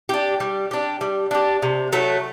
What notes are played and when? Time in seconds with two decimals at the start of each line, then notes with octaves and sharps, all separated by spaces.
0.09 D4 G4
0.40 G3
0.71 D4 G4
1.01 G3
1.31 D4 G4
1.62 C3
1.93 F#3 A3